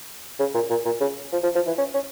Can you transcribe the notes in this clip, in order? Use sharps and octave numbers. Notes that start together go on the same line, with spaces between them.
C#3
A#2
A#2
A#2
C#3
F3
F3
F3
E3
C#4
C#4